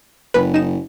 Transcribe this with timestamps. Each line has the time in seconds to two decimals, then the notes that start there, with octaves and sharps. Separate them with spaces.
0.34 F#1 B4
0.54 D#4 E7